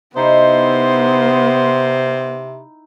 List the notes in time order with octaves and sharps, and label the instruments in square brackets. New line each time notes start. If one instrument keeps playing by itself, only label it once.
[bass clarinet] C3 [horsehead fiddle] B3 [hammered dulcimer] D#4 E4 [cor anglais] C5